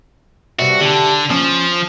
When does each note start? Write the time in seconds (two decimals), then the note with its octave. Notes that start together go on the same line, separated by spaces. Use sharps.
0.59 G2 C3 F#4 E5
0.81 D3 G4 A5
1.30 F3 C#4